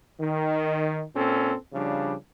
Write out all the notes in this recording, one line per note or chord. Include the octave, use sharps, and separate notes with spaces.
D#3
A#2 C4 C#4 A4
C#3 F3 G3 D4